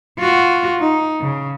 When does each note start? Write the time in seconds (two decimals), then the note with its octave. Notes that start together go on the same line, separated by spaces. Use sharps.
0.19 F4 F#4
0.79 D#4
1.21 C#3